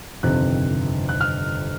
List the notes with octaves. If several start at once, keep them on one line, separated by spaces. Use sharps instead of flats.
G1 F2 C3 D#3 F#6
F#6
F6